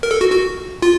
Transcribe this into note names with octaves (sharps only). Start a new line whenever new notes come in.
A#4
A4
F#4
F#4
F4